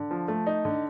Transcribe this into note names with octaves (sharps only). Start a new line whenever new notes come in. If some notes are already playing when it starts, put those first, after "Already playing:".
Already playing: D3
F3
A3
D#4
D3